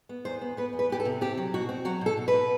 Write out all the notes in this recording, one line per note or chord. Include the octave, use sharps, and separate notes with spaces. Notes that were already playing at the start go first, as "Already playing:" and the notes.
B3
E2 C5
B3
B3 B4
E2
B4
B3 G4
A4
C3
C4 G4
F#3
B2 F#4
C4
F#3 F#4
B2 A4
B2
B2 B4